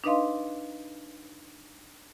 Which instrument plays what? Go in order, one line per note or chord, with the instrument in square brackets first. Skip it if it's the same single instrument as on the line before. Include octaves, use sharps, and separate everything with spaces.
[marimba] D4 D#4 B4 D#5 F5 C6